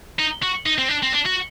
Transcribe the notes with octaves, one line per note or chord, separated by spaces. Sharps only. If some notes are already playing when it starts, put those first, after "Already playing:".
D#4
F#4
D#4
C4
D4
C4
D4
F#4